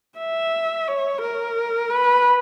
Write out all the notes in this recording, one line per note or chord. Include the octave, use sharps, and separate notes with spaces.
E5
C#5
A#4
B4